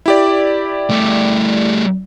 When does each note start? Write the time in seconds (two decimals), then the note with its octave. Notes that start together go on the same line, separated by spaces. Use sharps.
0.06 E4 G4 D5
0.90 G3 A3